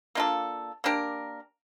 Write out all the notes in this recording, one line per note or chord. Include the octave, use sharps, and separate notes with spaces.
A#3 D4 F4 A4
A#3 D4 G4 A#4